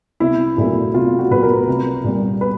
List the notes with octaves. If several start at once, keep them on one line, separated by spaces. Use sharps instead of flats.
C2 E4
A#2 F#3 A3 E4
C2 F4
F#4
A#2 F#3 A3 B4
A#4
C2
A#2 G3
B4